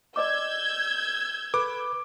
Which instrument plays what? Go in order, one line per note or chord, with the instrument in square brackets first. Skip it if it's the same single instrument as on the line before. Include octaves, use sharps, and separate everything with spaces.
[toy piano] D5 D#5 D6 [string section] E6 G6 G#6
[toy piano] A4 [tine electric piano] B4 [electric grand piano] D6